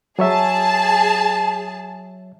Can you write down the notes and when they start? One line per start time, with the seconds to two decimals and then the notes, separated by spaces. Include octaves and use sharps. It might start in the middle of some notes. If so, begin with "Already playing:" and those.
0.19 F#3 G#4 C#5 E5 A5